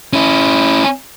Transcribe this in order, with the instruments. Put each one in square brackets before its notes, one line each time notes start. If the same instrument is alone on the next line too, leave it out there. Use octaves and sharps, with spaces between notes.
[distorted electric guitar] C#4 E4